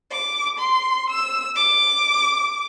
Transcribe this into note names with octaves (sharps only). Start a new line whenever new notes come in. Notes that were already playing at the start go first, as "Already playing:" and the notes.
D6
C6
E6
D6